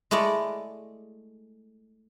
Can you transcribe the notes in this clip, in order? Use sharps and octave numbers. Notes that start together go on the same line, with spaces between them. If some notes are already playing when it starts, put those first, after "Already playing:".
G#3 A3 E4 D5 D#5